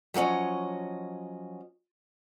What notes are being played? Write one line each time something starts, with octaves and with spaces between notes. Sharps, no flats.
F3 F#3 A#3 C#4 D#5